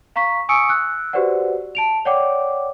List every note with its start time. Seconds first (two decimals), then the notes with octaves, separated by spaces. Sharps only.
0.16 F5 A#5 C#6 B6
0.49 G#5 C#6 D#6 E6 C#7 D7
0.69 E6 F#6
1.13 F#4 G4 B4 C5 D5 F#5
1.75 A5 D7 F7
2.05 C#5 D5 F#5 G5 D6